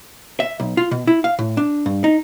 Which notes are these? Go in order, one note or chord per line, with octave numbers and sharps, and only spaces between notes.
E5
B1
F4
B2
E4
F5
A2
D4
G2
D#4